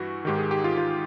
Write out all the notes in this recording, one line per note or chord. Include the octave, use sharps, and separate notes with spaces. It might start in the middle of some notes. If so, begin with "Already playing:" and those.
Already playing: G2 E3 F#4
G#2 D#3 G4
G#4
G4
F4
F4